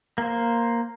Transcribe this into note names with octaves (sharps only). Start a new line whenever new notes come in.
A#3 C5